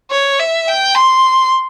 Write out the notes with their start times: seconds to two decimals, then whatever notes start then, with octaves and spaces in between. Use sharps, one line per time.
0.11 C#5
0.39 E5
0.68 G5
0.95 C6